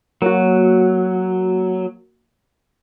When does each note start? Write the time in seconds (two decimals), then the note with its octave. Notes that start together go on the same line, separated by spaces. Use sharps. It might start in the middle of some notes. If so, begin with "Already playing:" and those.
0.22 F#3 A#3 F#4